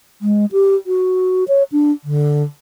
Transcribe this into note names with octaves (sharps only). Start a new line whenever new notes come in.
G#3
G4
F#4
C#5
D4
D3